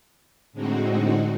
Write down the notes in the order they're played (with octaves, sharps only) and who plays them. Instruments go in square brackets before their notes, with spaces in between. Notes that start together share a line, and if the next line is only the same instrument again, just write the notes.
[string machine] A2 D3 G#3 C4 D#4 F#4